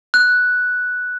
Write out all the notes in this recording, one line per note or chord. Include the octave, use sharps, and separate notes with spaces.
F#6